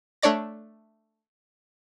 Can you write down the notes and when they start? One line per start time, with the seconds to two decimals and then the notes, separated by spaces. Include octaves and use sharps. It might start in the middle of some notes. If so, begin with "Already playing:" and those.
0.22 A3 D4 C#5 D5 A#6